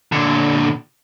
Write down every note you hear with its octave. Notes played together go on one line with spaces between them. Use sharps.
A#2 D3